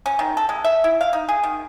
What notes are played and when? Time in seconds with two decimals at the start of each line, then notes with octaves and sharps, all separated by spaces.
0.06 C#4
0.19 D#3
0.37 A4
0.49 G#3
0.64 E5
0.84 E4
1.01 F5
1.13 D#4
1.29 G#4
1.43 D#3